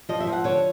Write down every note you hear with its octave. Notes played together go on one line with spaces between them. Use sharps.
F3 D#5
E5
F3
F#5
D3 C#5